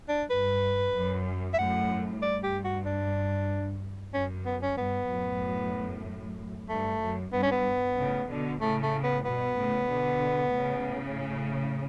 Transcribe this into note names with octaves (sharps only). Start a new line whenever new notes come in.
D4
G2 B4
F#2
E5
F#2 A2 F#5
G2 D5
G4
F#4
D4
F#2 C#4
B3
C#4
G2 B3
F#2 A2
G2 A3
F#2
G2 B3
C#4
B3
A2 C#3
B2 D3
A2 C#3 A3
A3
B3
G2 B2 B3
A2 C#3
B2 D3
A2 C#3